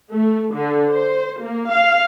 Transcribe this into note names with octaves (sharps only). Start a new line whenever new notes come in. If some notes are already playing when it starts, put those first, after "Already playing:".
A3
D3
C5
A#3
F5